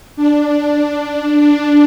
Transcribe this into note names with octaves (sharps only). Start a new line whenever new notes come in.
D4
D4